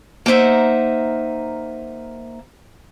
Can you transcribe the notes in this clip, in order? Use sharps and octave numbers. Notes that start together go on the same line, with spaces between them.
A#3 D#4 C5 E5 F#5